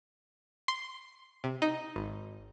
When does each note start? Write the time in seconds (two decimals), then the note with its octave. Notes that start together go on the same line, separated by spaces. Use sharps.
0.68 C6
1.44 C3
1.62 D#4
1.96 G#1